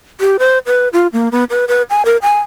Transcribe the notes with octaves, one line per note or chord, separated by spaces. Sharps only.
G4
C5
B4
F4
A#3
B3
B4
B4
G#5
A#4
G#5